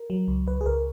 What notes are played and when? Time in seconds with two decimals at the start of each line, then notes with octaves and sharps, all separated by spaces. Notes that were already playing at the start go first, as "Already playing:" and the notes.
Already playing: A#4
0.10 F#3
0.28 C#2
0.47 C#2 B4
0.61 G#4
0.66 C#2 A#4